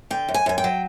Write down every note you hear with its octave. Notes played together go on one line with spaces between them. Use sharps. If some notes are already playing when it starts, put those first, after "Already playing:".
D3 G5
F#2
G#5
F#2 G#5
G5
F#3